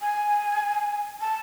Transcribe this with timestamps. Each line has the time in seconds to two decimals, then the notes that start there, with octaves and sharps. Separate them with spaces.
0.01 G#5
1.21 A5